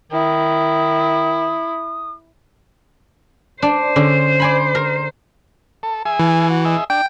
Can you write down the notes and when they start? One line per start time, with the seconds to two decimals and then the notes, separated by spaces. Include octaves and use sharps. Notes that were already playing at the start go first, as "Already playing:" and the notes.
0.12 D#3 E4 D#6
3.62 D4 C5
3.96 D3 C#4
4.40 D5 G#5 B5
4.75 A#4
5.83 A4
6.05 G#4 E5 G#5
6.20 E3
6.50 F#4
6.65 G#4 D#5 E5
6.90 D4 G5